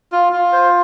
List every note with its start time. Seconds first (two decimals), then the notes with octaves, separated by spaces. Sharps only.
0.12 F4
0.33 F4
0.53 C5